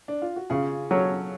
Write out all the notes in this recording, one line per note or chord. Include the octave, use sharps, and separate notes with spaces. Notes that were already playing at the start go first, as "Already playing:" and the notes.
D4
F4
F#4
C#3 F4 G#4
F#3 C#4 F#4 A4